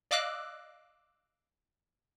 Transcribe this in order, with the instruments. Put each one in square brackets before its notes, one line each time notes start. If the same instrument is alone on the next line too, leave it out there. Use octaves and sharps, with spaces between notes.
[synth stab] D5 D#5 F5 D6 E6 F#6